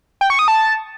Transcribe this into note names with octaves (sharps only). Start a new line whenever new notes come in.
G5
C#6
D#6
A5